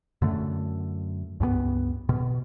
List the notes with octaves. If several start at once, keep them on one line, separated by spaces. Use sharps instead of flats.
F#2 D3 A3
C#2 G2 F#3 B3
B2